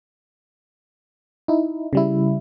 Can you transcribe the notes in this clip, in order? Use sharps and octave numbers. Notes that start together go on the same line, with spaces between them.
D#4 E4
C#3 G3 E4